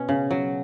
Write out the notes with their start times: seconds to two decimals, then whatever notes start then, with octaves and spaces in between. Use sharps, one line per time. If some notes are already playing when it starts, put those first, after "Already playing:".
Already playing: B2 C#4
0.09 C#3
0.31 F#3